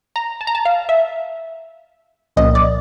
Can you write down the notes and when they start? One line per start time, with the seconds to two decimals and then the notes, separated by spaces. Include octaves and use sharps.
0.16 A#5
0.41 A5
0.47 A#5
0.55 A5
0.65 F5
0.89 E5
2.36 C2 A#2 F3 A#3 C#4 D#5
2.55 D5